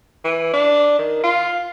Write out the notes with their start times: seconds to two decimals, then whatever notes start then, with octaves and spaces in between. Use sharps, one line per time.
0.24 E3
0.53 D4
0.99 D#3
1.23 F4